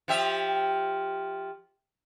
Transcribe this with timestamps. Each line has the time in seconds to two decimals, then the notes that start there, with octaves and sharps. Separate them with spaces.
0.08 F3 G4 E5